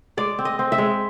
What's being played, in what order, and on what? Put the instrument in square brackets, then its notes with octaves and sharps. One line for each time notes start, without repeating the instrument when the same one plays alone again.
[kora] G#3 D5
C4
D#5
C4
E5
G#3